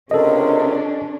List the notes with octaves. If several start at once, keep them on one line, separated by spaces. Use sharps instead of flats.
C#2 C3 C#4 D4 A4 A#4 D#5